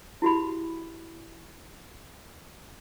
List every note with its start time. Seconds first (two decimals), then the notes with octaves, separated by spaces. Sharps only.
0.22 E4 F#4 G4 B5